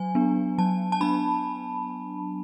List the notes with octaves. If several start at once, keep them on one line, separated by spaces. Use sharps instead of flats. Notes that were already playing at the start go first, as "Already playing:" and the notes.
Already playing: F#3 G#5
B3 D4
F#3 A5
A5
B3 D4 B5